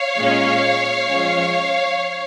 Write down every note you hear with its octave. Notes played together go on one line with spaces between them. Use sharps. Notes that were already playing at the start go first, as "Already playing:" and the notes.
Already playing: C#5 F5
A#2 G#3 C#4
F3 G#3 C#4